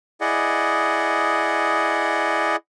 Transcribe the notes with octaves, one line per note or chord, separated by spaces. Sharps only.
E4 G#4 D5 D#5 F#5